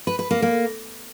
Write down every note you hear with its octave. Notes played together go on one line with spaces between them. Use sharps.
B4
B4
A#3
A#3